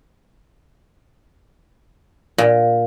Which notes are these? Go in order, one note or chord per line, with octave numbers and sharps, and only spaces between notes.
A#2